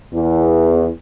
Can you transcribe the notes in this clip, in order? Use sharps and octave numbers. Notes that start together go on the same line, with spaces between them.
E2